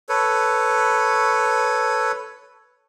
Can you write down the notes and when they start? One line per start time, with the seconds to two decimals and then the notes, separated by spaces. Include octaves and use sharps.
0.09 A4 B4 C#5